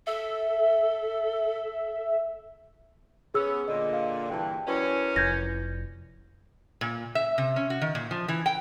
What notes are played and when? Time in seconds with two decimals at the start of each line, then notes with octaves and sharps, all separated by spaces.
0.07 A4 E5
3.34 B3 C#4 G#4 E6
3.68 A#2 D3 D#5
3.93 F5
4.30 G2 A#2 E3 G5 A5
4.68 F#2 F#3 C#4 E4 B4 D5
5.16 F1 G6 G#6 A#6
6.81 A#2
7.15 E5
7.38 C3
7.56 C#4
7.70 F#4
7.82 D#3
7.95 A#2
8.11 F3
8.28 E3
8.46 G5